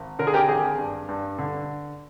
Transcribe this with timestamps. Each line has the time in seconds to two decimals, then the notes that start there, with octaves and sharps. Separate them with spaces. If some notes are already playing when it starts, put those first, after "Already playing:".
Already playing: G#1
0.19 D3 A#4
0.27 G#4
0.34 G4 A#4
0.48 G#1 G#4
0.78 G2
1.08 G2
1.38 D3